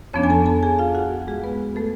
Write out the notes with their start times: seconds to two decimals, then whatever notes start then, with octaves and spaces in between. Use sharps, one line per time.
0.13 F2 F3 B3 C#4 D4 C#5
0.23 G#5
0.30 A4 A5
0.46 A4 A5
0.63 G#4 G#5
0.79 F4 F5
0.95 F#4 F#5
1.28 G#3 G#4
1.44 B3 B4
1.76 A3 A4